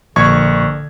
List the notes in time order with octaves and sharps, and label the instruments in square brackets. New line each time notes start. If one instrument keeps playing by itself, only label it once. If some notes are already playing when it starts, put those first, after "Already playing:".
[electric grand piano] A#1 C#6 G#6 [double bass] D3